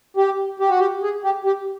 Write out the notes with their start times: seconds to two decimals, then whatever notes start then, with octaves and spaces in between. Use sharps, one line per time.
0.17 G4
0.60 G4
0.69 F#4
0.79 G4
1.02 G#4
1.24 G4
1.45 G4